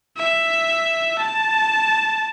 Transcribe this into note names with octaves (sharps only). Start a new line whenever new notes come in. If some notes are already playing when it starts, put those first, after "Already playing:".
E5
A5